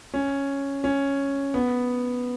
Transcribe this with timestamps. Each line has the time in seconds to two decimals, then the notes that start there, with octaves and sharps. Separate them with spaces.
0.14 C#4
0.84 C#4
1.54 B3